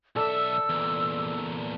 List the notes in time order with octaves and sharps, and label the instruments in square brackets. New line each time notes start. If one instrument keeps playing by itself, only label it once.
[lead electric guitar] B1 E5 [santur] A4 D5 [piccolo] E6
[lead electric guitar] E2 A#2